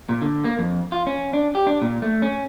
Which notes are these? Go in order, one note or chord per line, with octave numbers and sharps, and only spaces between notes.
A#2
D3
A#3
F2
F4
C#4
D4
G4
D4
A#2
A3
C#4